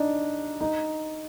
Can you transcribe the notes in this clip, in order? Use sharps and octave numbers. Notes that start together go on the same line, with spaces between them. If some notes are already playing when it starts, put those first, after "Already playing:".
Already playing: D4 D#4
D#4